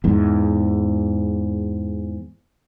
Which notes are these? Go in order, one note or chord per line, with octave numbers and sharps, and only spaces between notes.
E2 G#2